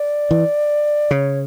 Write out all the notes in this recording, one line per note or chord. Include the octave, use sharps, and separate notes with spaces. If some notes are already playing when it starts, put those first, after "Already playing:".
Already playing: D5
E3
C#3 C#5